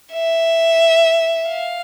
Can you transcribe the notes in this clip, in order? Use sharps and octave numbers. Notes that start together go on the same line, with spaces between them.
E5
F5